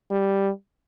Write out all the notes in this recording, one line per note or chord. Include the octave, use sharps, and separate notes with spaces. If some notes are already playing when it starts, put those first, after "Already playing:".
G3